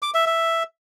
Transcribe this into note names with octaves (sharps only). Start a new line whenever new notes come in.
D6
E5
E5